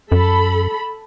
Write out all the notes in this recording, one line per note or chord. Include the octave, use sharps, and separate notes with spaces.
F#2 A4 B5